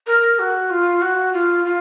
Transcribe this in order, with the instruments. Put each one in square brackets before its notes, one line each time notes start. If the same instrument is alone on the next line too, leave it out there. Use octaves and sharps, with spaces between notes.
[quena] A#4
F#4
F4
F#4
F4
F4